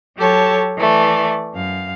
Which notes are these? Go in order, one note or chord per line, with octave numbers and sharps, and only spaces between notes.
F#3 G4 A4 C#5 A5
E3 A3 D5
F#2 F5